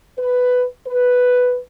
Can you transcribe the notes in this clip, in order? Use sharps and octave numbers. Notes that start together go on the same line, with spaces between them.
B4
B4